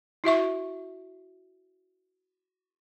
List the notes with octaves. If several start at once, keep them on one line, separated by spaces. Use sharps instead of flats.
E4 F#4 E5 C#6